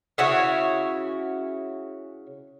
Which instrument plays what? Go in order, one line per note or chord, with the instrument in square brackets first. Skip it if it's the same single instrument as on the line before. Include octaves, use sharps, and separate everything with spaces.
[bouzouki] C#3 E4 F#4 C#5